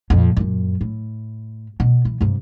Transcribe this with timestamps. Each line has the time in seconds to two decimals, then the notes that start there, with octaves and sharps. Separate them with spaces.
0.10 F2 A#2
0.37 F#2 A#2
0.81 A2
1.80 B2
2.05 E3
2.21 G2 C3